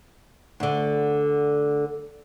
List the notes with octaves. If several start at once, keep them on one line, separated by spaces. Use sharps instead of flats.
D2 D3